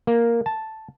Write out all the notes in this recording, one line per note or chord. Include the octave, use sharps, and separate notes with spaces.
A#3
A5